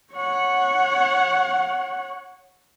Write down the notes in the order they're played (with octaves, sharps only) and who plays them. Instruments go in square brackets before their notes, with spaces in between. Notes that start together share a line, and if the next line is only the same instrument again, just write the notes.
[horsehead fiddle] C#5 F#5